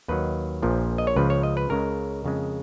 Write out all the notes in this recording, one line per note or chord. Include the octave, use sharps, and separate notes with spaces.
D#2 D#3 F#3 B4
A#1 A#2 F3
D#5
C#5
C#2 C#3 F3 B4
C#5
D#5
B4
C#2 C#3 G#3 A#4
F2 C#3 G#3